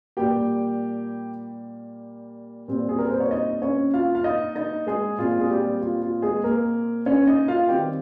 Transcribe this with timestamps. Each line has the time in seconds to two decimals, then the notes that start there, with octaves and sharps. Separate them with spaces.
0.17 A#2 G3 A#3 G4 G5
2.68 A#2 G3 C4
2.89 G#4
2.99 A#4
3.10 C5
3.20 C#5
3.31 D#4 D#5
3.62 C#4 C#5
3.94 F4 F5
4.15 F5
4.24 D#4 D#5
4.55 D#4 D#5
4.87 G#3 G#4
5.19 A#2 G#3 C4 F4
5.39 G#4
5.50 G3 G4
5.81 F4
6.02 F4
6.22 G#3 G#4
6.44 A#3 A#4
7.06 C#4 C#5
7.27 D#4 D#5
7.48 F4 F5
7.69 D#3 G3 C4 G4 G5